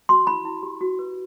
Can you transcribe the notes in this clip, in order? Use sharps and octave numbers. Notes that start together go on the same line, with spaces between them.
F#4 C6
E4 B5
E4
G4
F#4
B4